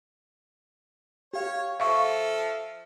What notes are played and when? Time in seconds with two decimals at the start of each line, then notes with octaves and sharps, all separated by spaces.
1.33 G4 C#5 F5
1.80 F3 A4 E5 F5 C#6